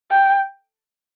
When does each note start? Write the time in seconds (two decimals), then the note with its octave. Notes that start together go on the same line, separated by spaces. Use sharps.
0.11 G5